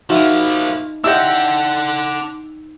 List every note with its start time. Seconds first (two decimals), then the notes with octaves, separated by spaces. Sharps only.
0.10 F3 A#3 D#4 F#4 E5
1.04 D4 E4 G4 D#5 F#5 E6 G6